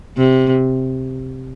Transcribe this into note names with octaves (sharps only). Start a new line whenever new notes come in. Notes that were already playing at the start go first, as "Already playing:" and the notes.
C3